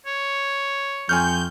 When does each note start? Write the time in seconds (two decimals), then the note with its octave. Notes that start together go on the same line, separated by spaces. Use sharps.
0.06 C#5
1.09 F2 G#5 C#6 F6 G6